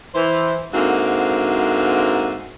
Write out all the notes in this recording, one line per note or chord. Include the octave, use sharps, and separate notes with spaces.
E3 C5
G#2 D3 A#3 C4 F#4 E5